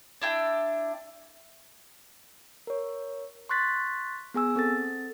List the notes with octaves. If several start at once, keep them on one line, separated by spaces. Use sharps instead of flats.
D4 E4 G5
A#4 C#5
C6 C#6 F#6 A6 B6
B3 G#4 G#5 E6
C4 A4 A6